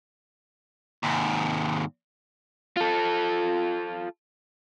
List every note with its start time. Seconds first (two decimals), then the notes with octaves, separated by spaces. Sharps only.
1.04 D#2 G#2
2.77 F4 A4